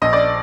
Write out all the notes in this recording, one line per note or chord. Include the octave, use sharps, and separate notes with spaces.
A#1 D#5
D5